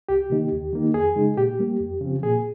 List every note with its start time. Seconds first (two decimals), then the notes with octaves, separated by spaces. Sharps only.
0.09 C2 G4
0.30 C3 D#3 A#3 D#4
0.52 D#2
0.73 D#3 A#3 D#4
0.94 F2 G#4
1.16 C#3 G#3 D#4
1.37 A#2 G4
1.59 G3 A#3
1.80 F2
2.01 C#3 F3 C4
2.23 A#2 G#4